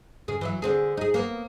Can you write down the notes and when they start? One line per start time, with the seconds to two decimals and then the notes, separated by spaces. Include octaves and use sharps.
0.28 C#3 G#4
0.41 E3 F#3 E4
0.62 D3 C4 G#4
0.97 D#4 G#4
1.14 A#3 B3